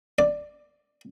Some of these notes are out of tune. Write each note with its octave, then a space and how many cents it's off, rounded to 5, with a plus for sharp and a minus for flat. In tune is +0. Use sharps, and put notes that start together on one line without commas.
D5 +5